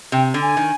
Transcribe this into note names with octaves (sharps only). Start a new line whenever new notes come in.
C3 G5
D3
G#5
D#3